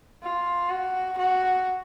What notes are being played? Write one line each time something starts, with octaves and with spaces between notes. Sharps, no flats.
F4
F#4
F#4